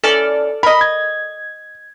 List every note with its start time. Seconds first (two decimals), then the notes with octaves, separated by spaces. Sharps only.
0.04 E3 C#4 A4 D5 F6
0.63 A#4 D#5 B5
0.81 G#6